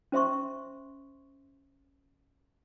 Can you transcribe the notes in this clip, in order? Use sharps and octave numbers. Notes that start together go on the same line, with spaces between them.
C#4 C5 E5 C6 C#6